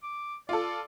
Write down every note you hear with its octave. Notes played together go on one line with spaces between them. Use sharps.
D6
F4 A4 D5